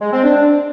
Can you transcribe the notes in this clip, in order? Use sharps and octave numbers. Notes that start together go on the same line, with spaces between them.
G#3
C4
D4